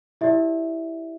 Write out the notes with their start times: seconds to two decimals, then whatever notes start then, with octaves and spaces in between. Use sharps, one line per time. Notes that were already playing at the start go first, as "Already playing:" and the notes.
0.21 E4 G4 D5 E5